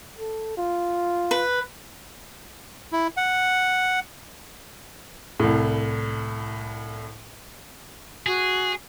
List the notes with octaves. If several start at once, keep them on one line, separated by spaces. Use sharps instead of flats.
A4
F4
B4
E4
F#5
C2 A2
F#4 G#4